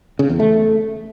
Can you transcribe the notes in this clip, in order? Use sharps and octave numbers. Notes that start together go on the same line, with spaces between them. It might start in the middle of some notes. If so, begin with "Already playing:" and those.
C#3
E2
A3